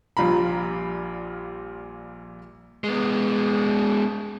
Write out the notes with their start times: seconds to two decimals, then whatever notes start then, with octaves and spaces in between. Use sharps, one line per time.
0.17 A#1 A#2 G3 F4 A#5 B5
2.84 G#3 B3